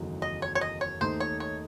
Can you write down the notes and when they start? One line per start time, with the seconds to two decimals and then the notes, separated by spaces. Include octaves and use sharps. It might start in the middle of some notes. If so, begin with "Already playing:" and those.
Already playing: F#1 E2 D#3 F#3 A3
0.22 D#5
0.42 C#5
0.55 C#5
0.61 D#5
0.81 C#5
1.01 D#2 D#3 A3 D#4 C5
1.20 C#5
1.40 C#5